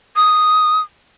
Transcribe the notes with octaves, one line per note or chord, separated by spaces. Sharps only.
D#6